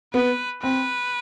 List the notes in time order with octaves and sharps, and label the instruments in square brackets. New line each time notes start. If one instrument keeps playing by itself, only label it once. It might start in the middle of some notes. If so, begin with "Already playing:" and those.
[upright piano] B3 [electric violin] B4
[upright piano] C4 [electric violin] B4